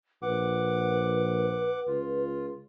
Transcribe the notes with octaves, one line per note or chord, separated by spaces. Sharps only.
A#1 B4 F#5 D6
C#2 F4